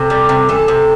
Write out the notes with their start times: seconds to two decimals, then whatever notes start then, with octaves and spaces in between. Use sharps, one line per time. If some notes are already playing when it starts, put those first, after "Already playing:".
Already playing: C3 A4
0.10 G3
0.29 C3
0.49 E3 A4
0.68 C3